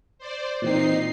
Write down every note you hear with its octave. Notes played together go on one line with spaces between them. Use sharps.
C5 D5
A#2 E3 C4 D#4 C7